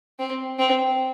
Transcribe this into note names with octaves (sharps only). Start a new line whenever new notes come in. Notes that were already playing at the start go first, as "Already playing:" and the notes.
C4
C4